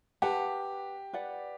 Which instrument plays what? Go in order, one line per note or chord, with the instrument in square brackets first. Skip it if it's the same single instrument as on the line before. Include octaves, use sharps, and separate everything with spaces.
[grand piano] G4 [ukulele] B4 F#5 A5
[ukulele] B4 D5 F#5